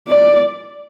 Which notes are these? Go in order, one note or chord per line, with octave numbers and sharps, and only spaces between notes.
D5